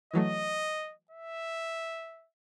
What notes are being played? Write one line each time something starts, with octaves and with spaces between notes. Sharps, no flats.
E3 F#3 A3 D#5
E5